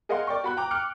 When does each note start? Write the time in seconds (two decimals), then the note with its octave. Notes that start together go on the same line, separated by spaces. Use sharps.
0.09 G#4 A#4 D#5 F5 F#5 C6
0.27 A#4 D5 G5 C#6
0.44 F#4 B5 F#6
0.57 G5 A#5 D6
0.71 G5 D6 F6 F#6 C#7 D7